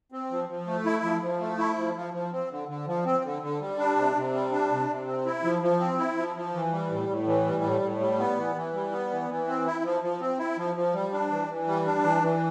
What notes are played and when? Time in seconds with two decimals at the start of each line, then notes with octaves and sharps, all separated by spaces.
0.12 C4
0.30 F3
0.49 F3
0.67 A3
0.85 E4
1.04 F3
1.22 F3
1.40 A3
1.58 E4
1.77 F3
1.96 F3
2.14 F3
2.32 C4
2.51 D3
2.68 D3
2.87 F3
3.06 C4
3.24 D3
3.42 D3
3.61 G3
3.79 D4
3.97 C3
4.16 C3
4.33 G3
4.52 D4
4.71 C3
4.89 C3
5.07 C4
5.26 E4
5.44 F3
5.62 F3
5.80 C4
5.99 E4
6.17 F3
6.35 F3
6.54 E3
6.72 G3
6.90 A2
7.08 A2
7.27 E3
7.46 G3
7.63 A2
7.82 A2
8.00 G3
8.19 B3
8.37 E3
8.55 E3
8.74 G3
8.92 B3
9.10 E3
9.29 E3
9.47 C4
9.66 E4
9.84 F3
10.03 F3
10.21 C4
10.39 E4
10.57 F3
10.76 F3
10.93 G3
11.12 D4
11.31 E3
11.49 E3
11.67 G3
11.86 D4
12.04 E3
12.22 E3